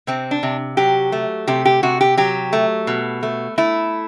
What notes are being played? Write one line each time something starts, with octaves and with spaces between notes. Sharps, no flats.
C3 C4
D4
C3
F#3 G4
A3
C3 G4
G4
C3 F#4
G4
F#3 G4
A3
B2
A3
A3 E4